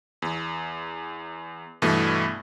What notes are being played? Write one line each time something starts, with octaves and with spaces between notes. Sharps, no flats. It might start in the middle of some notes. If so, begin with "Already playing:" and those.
E2
G2 B2 E3 A3